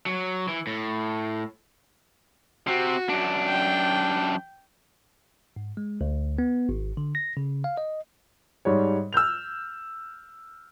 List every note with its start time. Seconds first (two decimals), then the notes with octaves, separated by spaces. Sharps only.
0.06 F#3
0.48 E3
0.67 A2
2.67 C3 C4 F#4
3.09 F#2 D4
3.48 G5
5.56 G#2
5.77 G#3
6.01 D2
6.39 B3
6.69 G#1
6.97 D3
7.15 A#6
7.37 C#3
7.64 F5
7.77 D#5
8.65 G#2 G3 C#5
9.13 E6 F6 G6 F7